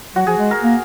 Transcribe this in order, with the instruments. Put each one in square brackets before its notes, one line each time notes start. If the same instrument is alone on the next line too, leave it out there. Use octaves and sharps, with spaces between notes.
[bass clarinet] F#3 [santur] F#4
[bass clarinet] F3 [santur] G#4
[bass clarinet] G#3
[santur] A#4
[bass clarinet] A#3